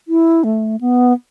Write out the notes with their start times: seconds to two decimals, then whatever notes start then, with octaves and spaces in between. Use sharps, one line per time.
0.08 E4
0.44 A3
0.81 B3